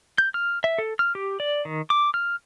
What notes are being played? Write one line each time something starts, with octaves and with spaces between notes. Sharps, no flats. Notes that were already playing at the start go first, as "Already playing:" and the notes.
G6
F6
E5
A4
F6
G4
D5
D#3
D6
F6